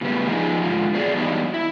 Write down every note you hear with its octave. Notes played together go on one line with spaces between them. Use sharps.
A2 C#3 G3 B3
F3 D#4 G#4
G#2 D3 F4
B2 F#3 G#4 D5
G2 E3 F#3 B3 D4 D#4
E4